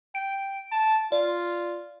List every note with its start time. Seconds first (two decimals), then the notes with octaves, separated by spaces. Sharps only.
0.15 G5 D7
0.72 A5
1.12 F4 D5